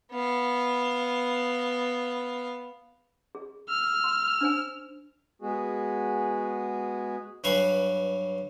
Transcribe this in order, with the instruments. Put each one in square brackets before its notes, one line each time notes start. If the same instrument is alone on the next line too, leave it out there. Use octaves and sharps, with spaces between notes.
[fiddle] B3 F5
[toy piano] G#4
[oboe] E6 [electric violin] F6
[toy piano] C6
D4 C5 G#5
[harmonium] G#3 B3 F#4 G#4
[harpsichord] G2 F#3 B4 F5 G#5 C#6